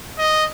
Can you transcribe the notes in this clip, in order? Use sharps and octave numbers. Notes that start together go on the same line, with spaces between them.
D#5